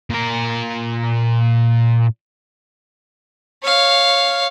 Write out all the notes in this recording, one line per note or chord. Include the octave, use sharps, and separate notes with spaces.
A#2 A#4
C#5 F5